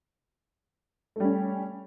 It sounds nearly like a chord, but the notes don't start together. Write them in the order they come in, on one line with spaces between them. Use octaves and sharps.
A3 G3 C#4